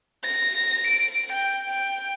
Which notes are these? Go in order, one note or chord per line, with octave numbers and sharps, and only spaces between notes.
A#6
D7
G5
G5